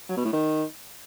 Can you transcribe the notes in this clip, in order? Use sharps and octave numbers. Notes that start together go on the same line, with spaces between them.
F#3
B2
A2
D#3